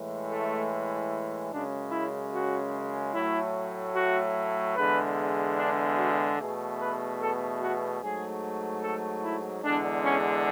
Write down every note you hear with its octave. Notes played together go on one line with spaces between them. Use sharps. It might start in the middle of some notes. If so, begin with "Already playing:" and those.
Already playing: A2 E3 G#3
A3
F#2 C#3 G#3 D4
E4
F#4
A2 F#3 A3 E4
F#4
E2 D3 G#3 B4
D4
F#4
E2 B2 A3 G#4
B4
A4
F#4
G#2 F#3 A3 G#4
A4
E4
E2 D3 G#3 D4
C#4